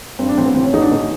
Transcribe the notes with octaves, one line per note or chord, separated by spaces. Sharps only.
G2 C4
D4
A1 C4
B3
E3 C4
C#4
A1 D#4
D4
E3 D#4